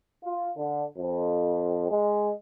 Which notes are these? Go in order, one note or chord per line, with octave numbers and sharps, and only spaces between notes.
F4
D3
F2
G#3